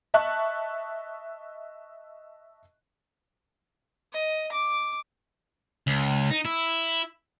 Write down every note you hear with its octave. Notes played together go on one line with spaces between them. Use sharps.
D#5 E5 A5 C#6 F#6
D#5
D6
C#2
D#4
E4